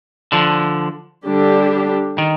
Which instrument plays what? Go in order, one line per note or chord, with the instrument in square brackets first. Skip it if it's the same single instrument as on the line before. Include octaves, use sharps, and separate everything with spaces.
[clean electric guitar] D3 F3
[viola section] D3 G3 D4 G4
[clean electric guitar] D#3